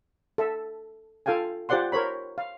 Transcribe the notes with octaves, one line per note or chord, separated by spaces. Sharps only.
A4 E5
F4 A4 F5 G5 G#5
F4 G4 C5 D5 F#5 C6
A#4 C5 C#5 B5
F5